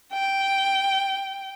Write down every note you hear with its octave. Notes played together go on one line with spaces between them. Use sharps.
G5